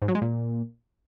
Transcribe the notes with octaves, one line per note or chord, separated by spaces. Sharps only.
G#2
F#3
G#3
A#2